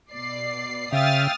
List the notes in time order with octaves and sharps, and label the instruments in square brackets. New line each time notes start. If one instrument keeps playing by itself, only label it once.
[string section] B2 D5 C7
[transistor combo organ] C#3 [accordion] E5 F5 G5 [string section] D#6 F6 A6